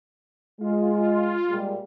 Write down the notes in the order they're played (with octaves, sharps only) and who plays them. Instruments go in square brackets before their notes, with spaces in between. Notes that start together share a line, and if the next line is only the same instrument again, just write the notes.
[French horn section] G#3 [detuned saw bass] F4
[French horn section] A#2 G3 G#3